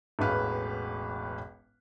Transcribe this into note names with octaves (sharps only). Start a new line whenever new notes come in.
E1 A1 B4 F5